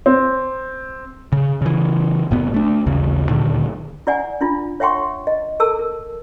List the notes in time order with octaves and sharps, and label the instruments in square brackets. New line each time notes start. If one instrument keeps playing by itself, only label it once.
[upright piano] C4
[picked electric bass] C#3
C#3 E3
F#1 A2 B3
A3 D4
A1 D#2 C#3
D2 A#2 D3 D#3
[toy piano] E4 D5 F#5 G#5
D4 E4 F4
C#5 E5 F#5 G5 C6 C#6
D#5
A4 A#4 A5 E6
A#4